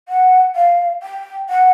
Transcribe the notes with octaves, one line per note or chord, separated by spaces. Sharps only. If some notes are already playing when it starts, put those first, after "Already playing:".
F#5
F5
G5
F#5